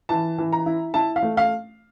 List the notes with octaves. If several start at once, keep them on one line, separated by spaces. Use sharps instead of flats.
E3 A5
E3
A#5
E4
E4 A5
F5
A3
F5